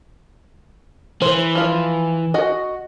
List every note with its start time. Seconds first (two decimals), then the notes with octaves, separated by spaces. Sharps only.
1.22 E3 C5
1.55 F3 F4
2.34 F#4 D#5